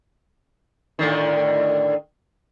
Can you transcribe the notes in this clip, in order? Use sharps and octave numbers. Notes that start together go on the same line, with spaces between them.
A2 D3 D#3